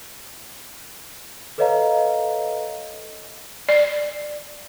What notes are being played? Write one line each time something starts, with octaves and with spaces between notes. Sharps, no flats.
A4 B4 C#5 D#5 F5 A#5
D5